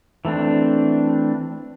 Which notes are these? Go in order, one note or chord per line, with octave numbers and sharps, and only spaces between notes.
E3 A3 C4 D4